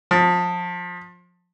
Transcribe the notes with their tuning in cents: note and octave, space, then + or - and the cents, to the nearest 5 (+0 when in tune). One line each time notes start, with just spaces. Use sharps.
F3 +30